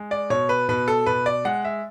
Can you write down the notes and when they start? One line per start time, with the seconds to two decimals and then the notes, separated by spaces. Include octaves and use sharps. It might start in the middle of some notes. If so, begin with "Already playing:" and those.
Already playing: G#3
0.11 D5
0.30 B2 C#5
0.49 B4
0.69 B2 B4
0.88 A4
1.06 B2 B4
1.26 D5
1.45 G#3 F#5
1.65 E5